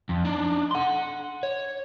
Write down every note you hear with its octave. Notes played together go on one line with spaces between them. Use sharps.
F2
D4 D#4
F#5 C6
C#5